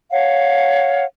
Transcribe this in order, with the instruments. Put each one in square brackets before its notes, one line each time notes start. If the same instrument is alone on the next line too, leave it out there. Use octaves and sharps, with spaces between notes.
[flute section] C#5 F5 F#5